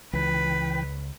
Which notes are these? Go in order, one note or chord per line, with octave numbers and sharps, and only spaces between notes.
C#2 E3 B4 G5